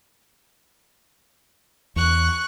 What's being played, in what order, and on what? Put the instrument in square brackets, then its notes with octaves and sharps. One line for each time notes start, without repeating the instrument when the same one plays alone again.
[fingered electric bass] E2 [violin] C#6 F#6